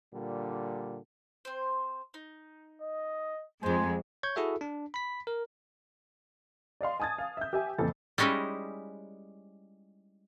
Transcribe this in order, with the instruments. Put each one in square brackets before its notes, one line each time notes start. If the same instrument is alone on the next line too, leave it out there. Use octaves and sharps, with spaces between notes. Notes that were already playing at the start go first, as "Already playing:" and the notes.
[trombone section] A#2 D3 G3
[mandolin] C4 C5
D#4
[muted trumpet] D#5
[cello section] F2 G#3 [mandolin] F4 C5 [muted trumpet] G#5
[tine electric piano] C#5 C#6 G6 G#6
E4 F#4 G#4 A4 E5
D4
B5 B6
A#4
[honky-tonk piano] D5 D#5 F5 C6
G#5 A5 D#6 G#6 A6
F5
E5 G6
G4 E5 G#5
F#1 F2 A#2 E3 A4 A6
[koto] G3 G#3 C#4 D#4 E4